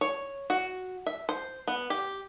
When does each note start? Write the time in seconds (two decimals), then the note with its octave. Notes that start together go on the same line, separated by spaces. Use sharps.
0.01 C#5
0.50 F#4
1.06 E5
1.29 C5
1.67 B3
1.90 G4